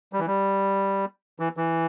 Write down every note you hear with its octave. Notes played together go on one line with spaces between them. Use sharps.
G3
E3
G3
E3
E3